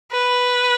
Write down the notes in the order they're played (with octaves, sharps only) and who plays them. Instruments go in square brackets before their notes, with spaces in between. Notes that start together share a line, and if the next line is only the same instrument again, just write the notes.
[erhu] B4